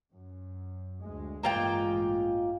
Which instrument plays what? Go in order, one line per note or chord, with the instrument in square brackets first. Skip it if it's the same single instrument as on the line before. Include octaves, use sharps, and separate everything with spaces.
[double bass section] F#2
D2 G#3
[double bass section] A1 G2 G#3 [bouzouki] A#3 F4 G5